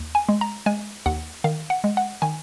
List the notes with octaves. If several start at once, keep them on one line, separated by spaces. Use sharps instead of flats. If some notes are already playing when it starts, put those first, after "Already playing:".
Already playing: D#2
G#5
G#3
A#5
G#3 G#5
D#2 F#5
D#3 F5
F#5
G#3
F#5
D#3 G#5